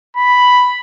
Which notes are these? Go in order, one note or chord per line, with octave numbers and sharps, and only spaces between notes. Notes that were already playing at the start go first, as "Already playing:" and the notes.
B5